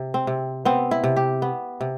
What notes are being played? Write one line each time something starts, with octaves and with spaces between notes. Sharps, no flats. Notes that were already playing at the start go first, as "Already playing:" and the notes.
Already playing: C3
C4
C3
B3 C4
E4
C3
G4
B3
C3